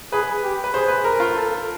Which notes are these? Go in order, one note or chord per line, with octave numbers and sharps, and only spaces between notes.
G#4 B4
G4
B4
G#4 C5
B4
A#4
F4
A4